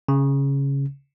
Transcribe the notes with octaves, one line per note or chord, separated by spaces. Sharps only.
C#3